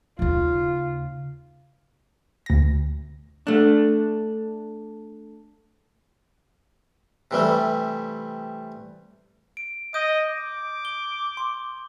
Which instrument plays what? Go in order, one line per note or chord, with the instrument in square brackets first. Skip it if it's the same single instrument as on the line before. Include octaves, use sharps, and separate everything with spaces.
[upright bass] D#2 C#3 [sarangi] F4
[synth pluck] D2 A#6
[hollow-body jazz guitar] A3 D4
[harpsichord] C3 E3 G3 A3
[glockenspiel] D7
[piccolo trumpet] D#5 [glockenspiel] D#6 G6
[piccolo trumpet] D6
[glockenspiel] G7
C6